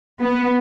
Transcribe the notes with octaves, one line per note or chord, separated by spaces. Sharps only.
B3